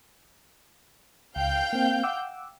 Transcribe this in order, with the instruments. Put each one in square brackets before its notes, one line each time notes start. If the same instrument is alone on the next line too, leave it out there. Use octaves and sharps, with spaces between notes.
[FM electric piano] C#2 [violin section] F5 G5 G6
[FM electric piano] A#3 C4
F#5 D6 E6